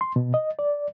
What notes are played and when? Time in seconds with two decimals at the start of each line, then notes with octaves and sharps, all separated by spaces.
0.01 C6
0.16 B2
0.34 D#5
0.59 D5